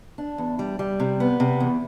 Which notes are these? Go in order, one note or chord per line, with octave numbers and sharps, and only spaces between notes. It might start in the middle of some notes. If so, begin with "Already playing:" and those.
D4
E2
G3
G3
C3
B3
C3
E2